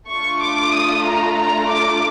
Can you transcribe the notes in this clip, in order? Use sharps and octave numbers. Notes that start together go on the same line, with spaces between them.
A3 D4 F4 A4 C#6
D6
D#6
A#5
A#5
D6